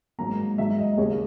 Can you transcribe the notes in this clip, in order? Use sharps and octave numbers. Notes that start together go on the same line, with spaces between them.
G#2 F#3 A#3 A#5
G#2 F#3 A#3 E5
D#5
D#2 C#3 G#3 C#5